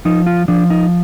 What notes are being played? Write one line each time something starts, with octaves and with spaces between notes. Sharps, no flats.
F3 D#4
F4
F3 D4
D#4